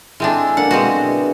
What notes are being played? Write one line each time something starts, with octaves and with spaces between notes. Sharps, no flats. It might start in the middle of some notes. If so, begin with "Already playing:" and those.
G#3 C4 D4 E4 A4 G#5
D3 F#3 A#3 F#5
B2 G#3 C4 F#4